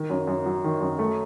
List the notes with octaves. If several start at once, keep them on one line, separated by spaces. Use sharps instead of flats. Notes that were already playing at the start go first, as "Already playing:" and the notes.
Already playing: D#3
F#2
F#2
F#3
D#3
F#2
A3